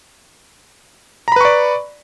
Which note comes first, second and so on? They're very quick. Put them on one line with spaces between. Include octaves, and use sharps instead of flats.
A#5 B5 B4 C#6 D5